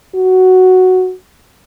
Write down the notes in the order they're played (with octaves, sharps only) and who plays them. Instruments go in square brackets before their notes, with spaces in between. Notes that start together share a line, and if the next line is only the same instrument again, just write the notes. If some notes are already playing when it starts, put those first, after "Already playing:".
[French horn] F#4